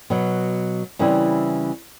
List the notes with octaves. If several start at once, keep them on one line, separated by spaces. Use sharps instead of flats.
B2 F#3 B3
C#3 E3 G3 C4 E4